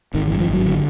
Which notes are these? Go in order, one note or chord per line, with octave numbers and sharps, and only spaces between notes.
G#1 D#3
E3
G2
F3
G#1 F#3
D3